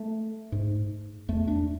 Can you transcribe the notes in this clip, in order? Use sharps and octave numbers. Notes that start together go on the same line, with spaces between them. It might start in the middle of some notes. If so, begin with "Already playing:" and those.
Already playing: A3
G#2
E2 A3
D4